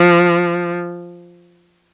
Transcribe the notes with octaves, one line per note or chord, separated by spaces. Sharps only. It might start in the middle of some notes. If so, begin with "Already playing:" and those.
Already playing: F3